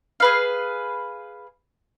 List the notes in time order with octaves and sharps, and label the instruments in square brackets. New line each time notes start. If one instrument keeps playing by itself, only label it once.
[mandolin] G#4 B4 F5